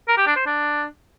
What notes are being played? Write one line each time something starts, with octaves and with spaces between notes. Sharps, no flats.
A#4
G4
D4
C5
D4